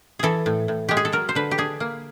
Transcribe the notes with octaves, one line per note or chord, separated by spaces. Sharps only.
E3 G#4 A4
A2
A2
G#3 G4
G#4
A4
F#3 A#4
C5
D3 B4
G4
D4 G#4
A#3